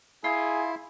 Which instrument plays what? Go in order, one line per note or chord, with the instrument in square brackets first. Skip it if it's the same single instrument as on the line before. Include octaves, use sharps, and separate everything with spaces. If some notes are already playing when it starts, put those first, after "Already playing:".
[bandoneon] E4 [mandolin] F4 [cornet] G#4